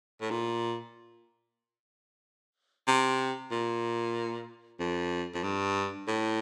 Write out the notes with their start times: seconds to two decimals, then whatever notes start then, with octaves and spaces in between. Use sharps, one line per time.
0.21 A2
0.31 A#2
2.87 C3
3.51 A#2
4.80 F2
5.34 F2
5.44 G2
6.08 A2